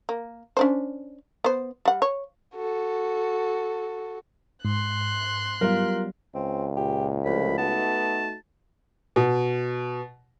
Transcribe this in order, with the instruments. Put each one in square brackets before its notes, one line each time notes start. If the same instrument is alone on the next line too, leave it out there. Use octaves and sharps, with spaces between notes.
[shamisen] A#3
C#4 D4 C5
B3 C5
G3 F#5
C#5
[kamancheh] F#4 A4
[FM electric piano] G#2 [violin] C6 F#6
[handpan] F#3 G3 B3 [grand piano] F4 A#4
[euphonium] C#2 [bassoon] C4
[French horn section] A#2 [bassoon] G4
[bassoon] C2 [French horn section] F3 A3 [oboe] B5
[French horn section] A3 D#4 F#4 [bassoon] B3 [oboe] A5
[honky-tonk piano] B2